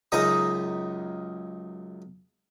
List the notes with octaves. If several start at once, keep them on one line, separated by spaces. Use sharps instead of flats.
C#2 F#2 D#4 A#5 D#6